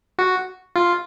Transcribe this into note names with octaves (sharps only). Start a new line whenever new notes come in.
F#4
F4